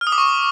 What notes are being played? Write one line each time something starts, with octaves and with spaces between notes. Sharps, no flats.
F6
D#6
D6
C#6